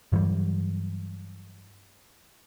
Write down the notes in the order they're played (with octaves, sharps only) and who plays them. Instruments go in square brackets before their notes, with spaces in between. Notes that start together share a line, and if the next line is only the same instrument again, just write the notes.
[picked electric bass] G2 E3 F#3 G3